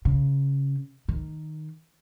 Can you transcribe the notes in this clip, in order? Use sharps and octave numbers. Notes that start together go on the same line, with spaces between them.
C#3
D#3